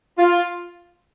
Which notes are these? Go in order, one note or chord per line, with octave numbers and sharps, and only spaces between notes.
F4